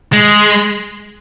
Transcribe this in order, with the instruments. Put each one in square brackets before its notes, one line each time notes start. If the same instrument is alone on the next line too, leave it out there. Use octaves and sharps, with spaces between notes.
[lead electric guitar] G#3